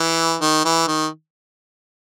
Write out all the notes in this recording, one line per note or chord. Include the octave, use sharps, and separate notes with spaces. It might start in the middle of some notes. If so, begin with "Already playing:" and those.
Already playing: E3
D#3
E3
D#3